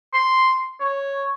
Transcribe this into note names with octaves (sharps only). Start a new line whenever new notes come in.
C6
C#5